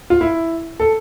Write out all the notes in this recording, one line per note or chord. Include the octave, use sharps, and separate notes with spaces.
F4
E4
A4